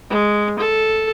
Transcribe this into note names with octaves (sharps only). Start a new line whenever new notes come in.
G#3
A4